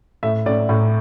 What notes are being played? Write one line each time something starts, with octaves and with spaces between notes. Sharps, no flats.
A2 E5
A2 D5
A2